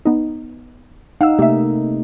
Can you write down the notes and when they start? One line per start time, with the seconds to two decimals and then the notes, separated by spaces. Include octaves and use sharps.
0.05 B3 D#4
1.21 D#4 F5 F#5 E6
1.39 C3 A3 A#3 G4 E5